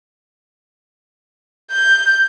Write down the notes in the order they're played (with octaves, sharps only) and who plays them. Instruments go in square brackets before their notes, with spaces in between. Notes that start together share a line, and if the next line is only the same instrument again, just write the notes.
[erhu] G6